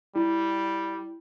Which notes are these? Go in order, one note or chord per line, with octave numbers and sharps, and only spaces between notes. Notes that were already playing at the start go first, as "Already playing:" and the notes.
G3 E4